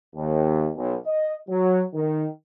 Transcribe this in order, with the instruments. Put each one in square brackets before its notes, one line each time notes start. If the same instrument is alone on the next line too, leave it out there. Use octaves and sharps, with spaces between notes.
[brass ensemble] D#2
B1
D#5
F#3
D#3